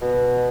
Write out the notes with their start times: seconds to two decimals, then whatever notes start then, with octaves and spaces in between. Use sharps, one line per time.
0.02 B2